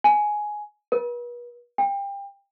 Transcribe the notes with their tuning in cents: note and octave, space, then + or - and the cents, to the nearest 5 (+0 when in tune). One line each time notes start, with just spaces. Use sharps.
G#5 +10
B4 -40
G5 +25